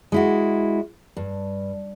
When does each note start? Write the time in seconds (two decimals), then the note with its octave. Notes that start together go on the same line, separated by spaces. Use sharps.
0.12 G#3 E4 F#4
1.17 G2